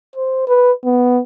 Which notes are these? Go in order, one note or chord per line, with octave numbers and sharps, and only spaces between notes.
C5
B4
B3